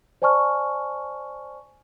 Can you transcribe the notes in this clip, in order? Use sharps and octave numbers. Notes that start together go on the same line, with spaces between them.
C5 D5 G#5 A5 C#6 F6